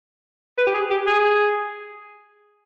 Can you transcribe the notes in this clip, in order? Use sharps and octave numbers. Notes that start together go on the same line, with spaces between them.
B4
G4
G#4
G4
G#4